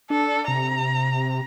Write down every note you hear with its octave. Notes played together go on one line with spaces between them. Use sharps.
D4 A4
C3 A#5